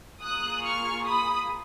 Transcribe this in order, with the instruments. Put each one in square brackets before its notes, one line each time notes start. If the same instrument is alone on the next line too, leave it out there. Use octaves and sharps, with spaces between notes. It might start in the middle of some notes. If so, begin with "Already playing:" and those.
[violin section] A#3 F4 G#4 D#6 F#6
C#6 F6
B5 D#6